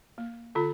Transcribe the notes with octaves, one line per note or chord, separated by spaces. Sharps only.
A#3
D3 F4 A4